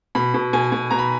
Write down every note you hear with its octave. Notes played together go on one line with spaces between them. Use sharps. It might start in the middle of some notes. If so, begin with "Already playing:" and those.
B2 B5
B2
B2 G#5
B2
B2 A#5
B5